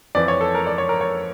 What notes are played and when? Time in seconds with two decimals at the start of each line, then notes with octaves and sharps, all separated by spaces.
0.15 F2 E3 D5
0.28 C#5
0.41 A4
0.55 A#4
0.67 D5
0.78 C#5
0.89 A#4
1.01 C#5